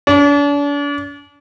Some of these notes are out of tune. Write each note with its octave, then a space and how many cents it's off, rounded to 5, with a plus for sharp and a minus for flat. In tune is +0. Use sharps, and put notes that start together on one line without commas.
D4 -40